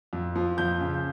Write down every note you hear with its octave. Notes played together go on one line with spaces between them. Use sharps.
F2
F3
F2 G6
C#3